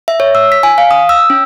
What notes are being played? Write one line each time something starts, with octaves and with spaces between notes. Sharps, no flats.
E5
C#5
E6
B6
G#5
F5
D#6
E6
C#4